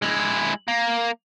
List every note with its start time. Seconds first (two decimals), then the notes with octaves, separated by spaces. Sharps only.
0.02 G#3 E4
0.68 A#3